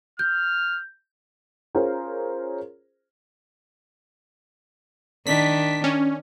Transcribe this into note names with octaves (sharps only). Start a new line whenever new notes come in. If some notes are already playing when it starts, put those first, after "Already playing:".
F6 G6
C#4 F4 G#4 A#4 C5
D#3 D4 B6
C#4